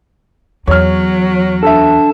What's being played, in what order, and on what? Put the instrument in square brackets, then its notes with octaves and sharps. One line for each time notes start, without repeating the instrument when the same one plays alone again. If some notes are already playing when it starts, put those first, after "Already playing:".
[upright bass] E2 [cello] F#3 [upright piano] C#5 F6
[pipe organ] D4 A5 [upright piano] A4 E5